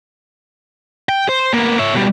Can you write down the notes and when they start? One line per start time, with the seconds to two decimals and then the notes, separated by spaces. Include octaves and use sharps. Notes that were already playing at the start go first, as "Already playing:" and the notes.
1.09 G5
1.29 C5
1.54 A#3 B3
1.79 C#5 E5
1.94 B2 G3